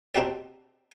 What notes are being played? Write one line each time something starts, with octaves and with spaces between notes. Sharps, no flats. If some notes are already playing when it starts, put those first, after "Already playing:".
C4 D4 D#4 F#4 G4 D5